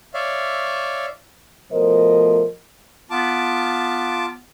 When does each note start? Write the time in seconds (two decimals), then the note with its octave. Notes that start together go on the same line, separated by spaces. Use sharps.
0.14 C#5 D5 E5 F5
1.72 B2 F3 A3 A#4 C5 D#5
3.10 B3 F4 A5 D6